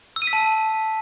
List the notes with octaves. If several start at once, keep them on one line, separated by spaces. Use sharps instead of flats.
E6
D#7
B6
A5